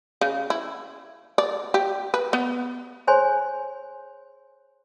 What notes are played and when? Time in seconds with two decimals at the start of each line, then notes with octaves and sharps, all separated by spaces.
0.21 C#3
0.50 E4
1.38 D5
1.74 G4
2.14 B4
2.33 B3
3.07 G#4 C5 C#5 G#5 C6